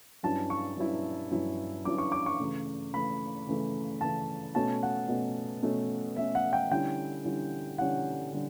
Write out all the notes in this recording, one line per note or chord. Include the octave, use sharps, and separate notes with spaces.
G2 F#3 C#4 E4 A5
C#6
G2 F#3 C#4 E4
G2 F#3 C#4 E4
G2 F#3 C#4 E4 D6
C#6
D6
C#6
C#3 E3 A3
C#3 E3 A3 B5
C#3 E3 A3
C#3 E3 A3 A5
B2 A3 C#4 A5
F#5
B2 A3 C#4
B2 A3 C#4
B2 A3 C#4 E5
F#5
G5
D3 G3 C#4 E4 G5
D3 G3 C#4 E4
D3 G3 C#4 E4 F#5
D3 G3